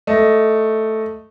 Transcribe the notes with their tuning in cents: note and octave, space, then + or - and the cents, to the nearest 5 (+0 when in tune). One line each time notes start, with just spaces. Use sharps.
A3 +0 D#5 +5